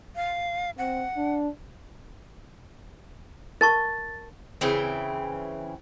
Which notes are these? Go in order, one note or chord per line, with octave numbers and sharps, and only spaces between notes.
F5
C4 F#5
D4
A#4 A5 C#6 A6
C#3 E3 C4